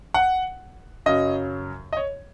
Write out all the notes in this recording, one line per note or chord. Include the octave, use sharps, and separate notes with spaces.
F#5
F#2 C#3 F#3 D#5
D#5
C#5